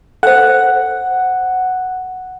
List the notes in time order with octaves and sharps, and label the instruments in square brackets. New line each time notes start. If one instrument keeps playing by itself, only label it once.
[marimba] A4 C5 [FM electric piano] F#5